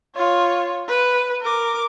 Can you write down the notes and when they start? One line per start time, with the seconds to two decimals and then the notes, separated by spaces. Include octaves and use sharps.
0.16 F4 C#5
0.88 B4
1.42 A#4 D6